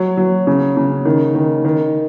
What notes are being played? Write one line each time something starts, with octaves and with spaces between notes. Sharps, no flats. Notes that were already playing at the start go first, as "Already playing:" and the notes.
Already playing: F#3
F#3
C#3
C#3
D#3
D#3
D#3